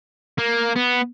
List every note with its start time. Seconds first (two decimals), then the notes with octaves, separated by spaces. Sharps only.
0.39 A#3
0.76 B3